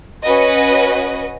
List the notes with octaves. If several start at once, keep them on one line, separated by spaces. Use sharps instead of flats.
C#4 F#4 B4 D#5